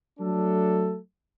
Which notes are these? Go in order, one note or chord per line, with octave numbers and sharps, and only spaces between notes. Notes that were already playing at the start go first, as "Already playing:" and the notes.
F#3 A3 D4 A4